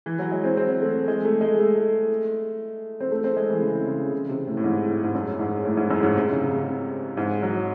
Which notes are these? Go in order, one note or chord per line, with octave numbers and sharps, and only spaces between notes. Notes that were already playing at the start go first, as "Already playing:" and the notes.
E3
F#3
G#3
C4
C4
A3
G#3
A3
G#3
A3
C4
A3
C4
G#3
E3
C#3
C#3
C#3
C3
A2
A2
G#2
G#2
F#2
G#2
A2
G#2
F#2
G#2
C3
C#3
C#3
G#2
F#3